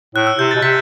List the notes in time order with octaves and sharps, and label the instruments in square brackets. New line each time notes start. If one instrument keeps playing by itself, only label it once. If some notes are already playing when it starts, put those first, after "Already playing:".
[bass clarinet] A2 [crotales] F#6
[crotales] E6
[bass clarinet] C3 [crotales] G6
[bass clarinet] B2 [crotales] A6
[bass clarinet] C3 [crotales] B6